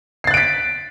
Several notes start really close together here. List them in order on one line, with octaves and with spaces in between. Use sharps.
C7 A6 F#6 D7 B6